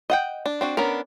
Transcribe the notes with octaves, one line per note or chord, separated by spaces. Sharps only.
D#5 F#5 G5
D4
C4 D4 F#4
B3 C#4 D4 A#4